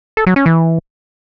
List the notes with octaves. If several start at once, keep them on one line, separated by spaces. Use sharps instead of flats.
A4
F#3
C#4
E3